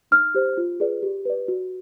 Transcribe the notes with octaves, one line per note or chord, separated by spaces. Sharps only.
D#4 F6
G4 C5
F4
G#4 B4 D5
G4
B4 D5
F#4